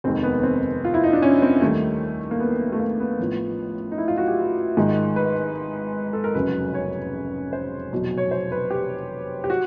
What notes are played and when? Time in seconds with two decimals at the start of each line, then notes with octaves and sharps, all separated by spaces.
0.04 F1 D#2 D#3 G#3 C4
0.23 B3
0.43 C4
0.85 F4
0.94 E4
1.04 D#4
1.13 D4
1.22 C#4
1.42 C4
1.62 D#2 D#3 G3 A3
2.31 A#3
2.40 B3
2.72 A3
2.80 A#3
3.00 B3
3.19 A1 A2 F3
3.92 D#4
3.98 E4
4.08 F4
4.18 F#4
4.28 G4
4.77 G#1 G#2 D#3 G#3
5.16 B4
6.13 A4
6.24 A#4
6.34 F1 E2 C#3 F#3 B4
6.74 C#5
7.53 C5
7.93 F1 E2 B2 F#3
8.18 C#5
8.31 C5
8.52 B4
8.71 G4
9.44 G4
9.50 F#4